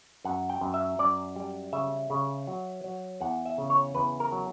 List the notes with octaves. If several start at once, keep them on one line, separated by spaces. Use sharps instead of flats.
F#2 F#5
G5
F#2
E5
F#2 D5
G3
C#3 E5
C#3
F#3
F#3
E2 F#5
E5
C#3
C#5
E2 B4
A#4
F#3